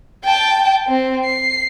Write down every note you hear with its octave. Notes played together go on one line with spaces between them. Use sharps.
G5 A5
C4
C7